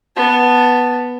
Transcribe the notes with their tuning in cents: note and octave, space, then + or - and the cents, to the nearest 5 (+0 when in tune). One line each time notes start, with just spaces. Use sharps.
B3 +0 A5 +0